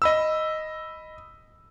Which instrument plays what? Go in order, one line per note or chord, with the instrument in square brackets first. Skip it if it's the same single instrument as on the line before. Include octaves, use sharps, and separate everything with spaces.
[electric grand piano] D#5 B5 E6